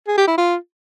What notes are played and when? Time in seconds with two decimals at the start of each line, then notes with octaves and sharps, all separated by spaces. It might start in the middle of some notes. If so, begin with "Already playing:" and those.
0.08 G#4
0.18 G4
0.28 E4
0.37 F4